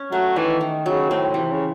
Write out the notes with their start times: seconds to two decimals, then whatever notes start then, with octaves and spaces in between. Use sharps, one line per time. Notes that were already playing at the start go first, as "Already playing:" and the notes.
Already playing: C#4
0.12 F#3 A3
0.36 D#3 E3
0.61 D#3
0.86 C#3 F#3
1.10 A2 C4
1.29 A2
1.34 C3 E3
1.51 C#3